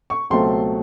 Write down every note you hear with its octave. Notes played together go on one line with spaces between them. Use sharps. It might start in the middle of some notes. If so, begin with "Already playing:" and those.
C#6
C#2 B2 F#3 A3 C4 C6